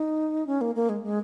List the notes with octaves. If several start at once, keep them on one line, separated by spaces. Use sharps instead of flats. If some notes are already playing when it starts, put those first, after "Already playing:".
Already playing: D#4
C#4
A#3
A#3
G#3
G#3